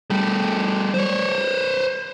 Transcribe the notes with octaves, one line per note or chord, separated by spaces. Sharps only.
G3 A3
C5 C#5